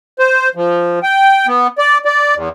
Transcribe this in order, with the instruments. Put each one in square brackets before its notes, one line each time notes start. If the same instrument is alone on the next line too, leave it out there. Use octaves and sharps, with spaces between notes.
[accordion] C5
F3
G5
B3
D5
D5
E2